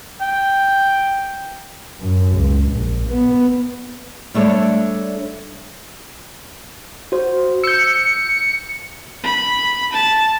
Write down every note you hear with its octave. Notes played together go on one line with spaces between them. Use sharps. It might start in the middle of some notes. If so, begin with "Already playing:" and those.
G5
F#2
C#2
A#1
B3
G3 A3 D4 A4 C#5 D5
F#4 C5
E6 G6 C#7
B5
A5